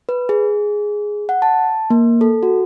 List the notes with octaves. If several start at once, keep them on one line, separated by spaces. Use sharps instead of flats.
B4
G#4
F#5
A5
A#3
A4
F#4